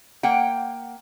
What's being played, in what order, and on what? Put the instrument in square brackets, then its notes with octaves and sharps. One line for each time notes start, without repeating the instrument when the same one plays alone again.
[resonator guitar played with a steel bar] A#3 F#5 G5